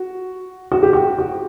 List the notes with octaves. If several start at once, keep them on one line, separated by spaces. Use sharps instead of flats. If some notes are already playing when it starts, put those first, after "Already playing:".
Already playing: F#4
F#4
G4
F#4
F#4